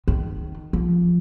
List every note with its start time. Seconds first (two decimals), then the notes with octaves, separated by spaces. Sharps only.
0.08 D#3
0.73 F3